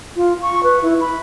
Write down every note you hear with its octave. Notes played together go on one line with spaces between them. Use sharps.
F4
C#6
B4
E4
B5